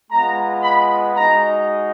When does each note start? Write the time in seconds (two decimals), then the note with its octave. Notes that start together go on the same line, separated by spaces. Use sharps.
0.10 G#3 B3 F4 A#5
0.62 B5
1.15 G#3 D#4 F#4 A#5